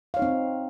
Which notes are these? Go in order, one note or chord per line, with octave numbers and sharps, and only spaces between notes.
C4 D#4 C#5 F5